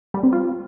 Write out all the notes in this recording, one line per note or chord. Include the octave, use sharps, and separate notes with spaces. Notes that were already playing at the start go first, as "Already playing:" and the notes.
G3
C4
F4